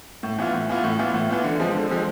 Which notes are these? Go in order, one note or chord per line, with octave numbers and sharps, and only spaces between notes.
A2
E3 B3 F4
A2
E3 B3 F4
A2
E3 B3 F4
A2
E3 B3 F4
D3
F3 G#3 C4
D3
F3 G#3 C4